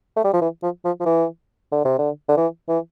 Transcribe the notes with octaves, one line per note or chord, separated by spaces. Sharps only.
A3
G3
F3
E3
F3
F3
F3
E3
D3
C3
D3
D3
E3
E3